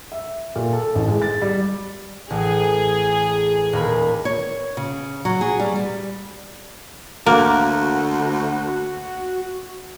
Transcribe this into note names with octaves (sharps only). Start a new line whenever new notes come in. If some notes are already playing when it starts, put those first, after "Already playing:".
E5
A#2
A4
A1
G#3
A6
G3
A1 G#4
D#1 A#4 B5
C#5
C#3
F#3
G#4
G3
G3
D2 A#3 F#4